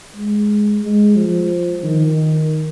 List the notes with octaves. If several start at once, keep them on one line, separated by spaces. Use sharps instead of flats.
G#3
G#3
F3
D#3